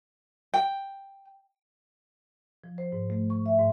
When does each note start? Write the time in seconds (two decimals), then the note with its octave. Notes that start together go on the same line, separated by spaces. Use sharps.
0.54 G5
2.64 F3
2.78 C5
2.92 G#2
3.10 A3
3.30 C#6
3.46 E5
3.59 G#2